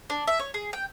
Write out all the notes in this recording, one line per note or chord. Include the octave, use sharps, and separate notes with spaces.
D4
E5
C#5
G#4
G5